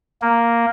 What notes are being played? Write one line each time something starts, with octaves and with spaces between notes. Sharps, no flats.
A#3